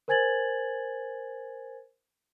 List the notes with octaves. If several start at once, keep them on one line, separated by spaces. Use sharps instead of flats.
A#4 C5 G#5 G#6 A6 F#7